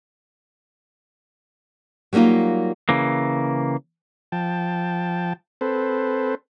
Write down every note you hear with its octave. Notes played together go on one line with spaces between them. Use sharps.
F#3 G3 A#3 D#4 F4
C#3 E3 A#3
F3 G5 A5
C4 A4 B4 C5